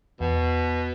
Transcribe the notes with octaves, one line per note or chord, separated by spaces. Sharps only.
E2 B2